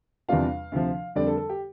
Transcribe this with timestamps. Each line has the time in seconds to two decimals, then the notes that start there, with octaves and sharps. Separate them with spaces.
0.29 E2 C3 G3 D4 F4 F5
0.72 D2 C3 F3
1.15 F2 D3 G3 D5
1.27 A4
1.37 A4
1.49 G4